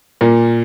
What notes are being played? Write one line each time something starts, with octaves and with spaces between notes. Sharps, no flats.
A#2 A#3